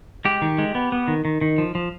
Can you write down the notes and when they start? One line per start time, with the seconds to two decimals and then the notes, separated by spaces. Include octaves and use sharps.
0.25 G#3 G4
0.42 D#3
0.58 G#3
0.75 B3
0.92 B3
1.08 D#3
1.25 D#3
1.41 D#3
1.58 F3
1.75 F3